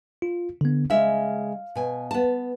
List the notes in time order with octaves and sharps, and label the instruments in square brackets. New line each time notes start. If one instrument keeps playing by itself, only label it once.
[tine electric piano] F4
D3 B3
[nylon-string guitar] C#3 G#3 E5 [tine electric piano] F5
[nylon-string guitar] B2 G#5
B3 A5